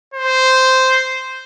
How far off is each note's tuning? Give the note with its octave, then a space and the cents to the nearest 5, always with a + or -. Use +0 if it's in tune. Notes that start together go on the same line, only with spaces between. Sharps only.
C5 -5